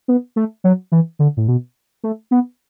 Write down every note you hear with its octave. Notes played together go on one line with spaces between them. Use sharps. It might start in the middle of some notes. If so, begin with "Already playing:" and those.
B3
A3
F#3
E3
D3
A2
B2
A3
B3